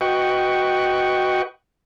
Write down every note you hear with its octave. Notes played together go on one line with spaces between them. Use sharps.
F#4 B4 D#5 F#5 G5 C#6